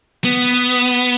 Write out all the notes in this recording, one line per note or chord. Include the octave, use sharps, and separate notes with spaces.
B3